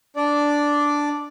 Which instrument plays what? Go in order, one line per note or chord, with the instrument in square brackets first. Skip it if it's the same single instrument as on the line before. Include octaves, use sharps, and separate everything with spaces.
[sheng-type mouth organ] D4 D5